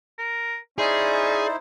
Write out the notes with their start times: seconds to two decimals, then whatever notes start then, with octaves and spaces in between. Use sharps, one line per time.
0.18 A#4
0.78 C#4 D#4 E4 G#4 C5 D5